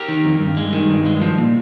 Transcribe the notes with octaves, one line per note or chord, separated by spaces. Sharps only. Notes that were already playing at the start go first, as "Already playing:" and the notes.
Already playing: G4 A#4
D#3
F2
G2
G#3
D#3
G2
G#3
F3
A#2